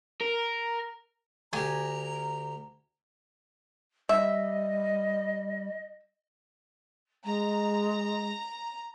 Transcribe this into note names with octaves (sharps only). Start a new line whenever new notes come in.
A#4
D2 G4 G#5 A#5
G3 D#5 E5
G#3 A#5